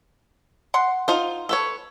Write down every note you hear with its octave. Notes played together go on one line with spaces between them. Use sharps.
F#5 C6
D#4 F4 C5
A4 B4 C#5